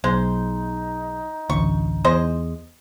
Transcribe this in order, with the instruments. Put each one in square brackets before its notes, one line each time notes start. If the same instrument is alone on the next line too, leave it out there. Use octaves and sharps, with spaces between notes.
[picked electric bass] B1 [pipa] G#3 C5 [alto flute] D#4
[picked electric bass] A1 D2 [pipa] C#6
[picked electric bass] E2 [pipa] G#3 C5 D#5